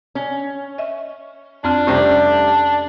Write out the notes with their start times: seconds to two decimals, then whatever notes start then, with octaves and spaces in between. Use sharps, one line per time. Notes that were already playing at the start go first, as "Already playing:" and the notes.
0.15 C#4
0.78 D#5 E5
1.64 F2 C4 D4 F6
1.87 C3 G3 A3 C#4 C5